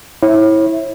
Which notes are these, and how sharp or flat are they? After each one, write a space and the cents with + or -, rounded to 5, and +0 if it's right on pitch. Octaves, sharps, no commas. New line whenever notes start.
E4 -20 C#5 -35 E5 +0